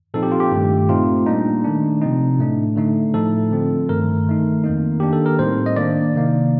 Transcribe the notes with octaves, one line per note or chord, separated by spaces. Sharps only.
A#2 F3 C4 D#4 A4
G4
F4
G4
G2 D#3 A3
A#2 A3 C4 D#4 F4
A#2 G3 A#3 D4 D#4
D#3 A3 D4
C3 F3 C4 D#4
A2 A3 D4
D3 A3 D#4
A2 F3 A3 D#4 A4
D3 F3 C4
G2 D#3 A3 A#4
D#3 A3 D#4
F2 D#3 A#3 D#4
D#3 A#3 D4 G4
A4
A#4
A2 G3 C4 D#4 C5
D#5
D#3 A#3 D4 D5
C3 D#3 A#3 D#4